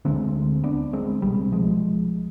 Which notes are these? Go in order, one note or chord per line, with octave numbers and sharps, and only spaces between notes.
D2 D3 G#3 C4
B3 D4
G#3 C4
C2 B2 G3 B3
F3 G#3